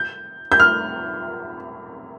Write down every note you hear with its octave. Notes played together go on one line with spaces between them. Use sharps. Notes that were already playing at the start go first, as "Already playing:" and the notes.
Already playing: G6
G6
F6